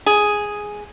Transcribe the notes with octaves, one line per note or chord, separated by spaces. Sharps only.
G#4